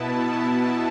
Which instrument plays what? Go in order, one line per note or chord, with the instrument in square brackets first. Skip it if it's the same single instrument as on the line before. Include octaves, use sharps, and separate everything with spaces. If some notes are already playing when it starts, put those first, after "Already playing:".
Already playing: [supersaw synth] B2 B3 E4 A5